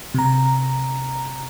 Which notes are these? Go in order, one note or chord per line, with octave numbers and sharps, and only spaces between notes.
C3 A#5